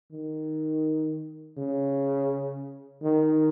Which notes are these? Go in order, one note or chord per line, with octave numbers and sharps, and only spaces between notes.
D#3
C#3
D#3